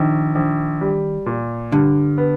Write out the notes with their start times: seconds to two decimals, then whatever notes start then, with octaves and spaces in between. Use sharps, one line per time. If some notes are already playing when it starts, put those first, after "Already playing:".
Already playing: A#1 D#3
0.35 A#1
0.81 G3
1.26 A#2
1.72 G2 D3
2.18 B3